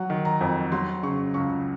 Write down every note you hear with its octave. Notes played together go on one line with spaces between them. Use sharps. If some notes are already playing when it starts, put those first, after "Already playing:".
Already playing: F#3 F#5
D#3
A#5
F2
F#3 C6
C#3 C#6
C#2 C#6